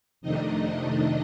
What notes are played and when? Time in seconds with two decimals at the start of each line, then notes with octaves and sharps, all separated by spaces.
0.21 F2 C3 D#3 A3 D4 D#4 D#5